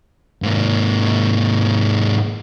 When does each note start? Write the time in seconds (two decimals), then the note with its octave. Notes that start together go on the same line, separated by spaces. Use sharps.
0.42 G#2 A#3